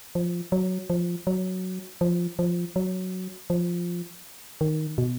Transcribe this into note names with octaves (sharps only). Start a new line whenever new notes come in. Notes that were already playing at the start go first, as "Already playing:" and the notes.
F3
F#3
F3
F#3
F3
F3
F#3
F3
D#3
B2